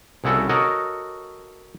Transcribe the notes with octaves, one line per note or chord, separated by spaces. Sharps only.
C2 C#3 E4 F#4 A4
F#4 A4 A#4 C#5 D#5